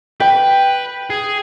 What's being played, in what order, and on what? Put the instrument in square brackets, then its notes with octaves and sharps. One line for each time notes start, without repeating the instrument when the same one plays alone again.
[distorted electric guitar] B4 [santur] G5
[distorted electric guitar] G#4